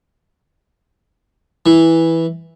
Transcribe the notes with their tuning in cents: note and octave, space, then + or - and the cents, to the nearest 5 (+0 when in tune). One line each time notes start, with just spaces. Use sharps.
E3 -5